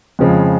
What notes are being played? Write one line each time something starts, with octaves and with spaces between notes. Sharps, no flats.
F2 C#3 F3 G#3